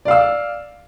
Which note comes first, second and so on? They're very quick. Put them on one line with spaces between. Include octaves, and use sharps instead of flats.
D5 F5 E6